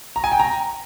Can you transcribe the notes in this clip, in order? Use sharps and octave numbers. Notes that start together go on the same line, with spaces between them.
A#5
G#5
G5
A#5